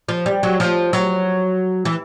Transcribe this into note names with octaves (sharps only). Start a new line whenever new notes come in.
F3
G3
F#3
F3
F#3
E3